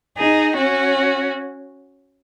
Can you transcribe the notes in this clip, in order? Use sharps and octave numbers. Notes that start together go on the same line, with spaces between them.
D#4 G#4
C#4 F#4